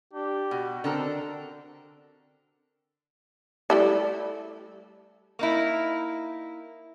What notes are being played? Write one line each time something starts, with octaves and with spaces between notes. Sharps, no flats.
D4 G4
B2 F#4
D3 C4 A4 A#4
G3 A3 E4
A#3 D#4 E4